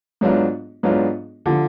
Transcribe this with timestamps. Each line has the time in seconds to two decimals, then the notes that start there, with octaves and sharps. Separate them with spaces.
0.21 G#2 F#3 B3 D4 F4
0.83 G#2 F#3 B3 D4 F4
1.46 D3 F3